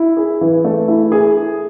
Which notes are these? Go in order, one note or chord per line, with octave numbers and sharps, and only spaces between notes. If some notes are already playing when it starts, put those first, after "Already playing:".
Already playing: E4
G#4
E3
A3
E4
G#4